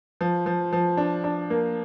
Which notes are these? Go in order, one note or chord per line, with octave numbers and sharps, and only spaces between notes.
F3
F3
F3
D4
D4
A#3